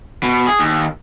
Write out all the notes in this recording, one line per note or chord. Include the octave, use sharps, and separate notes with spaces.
B2
G#4
D#2